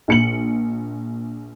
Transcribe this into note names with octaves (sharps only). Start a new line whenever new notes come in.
A#1 C#7 F#7